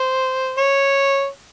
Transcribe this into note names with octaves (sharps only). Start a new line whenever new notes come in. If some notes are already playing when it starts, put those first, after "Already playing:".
Already playing: C5
C#5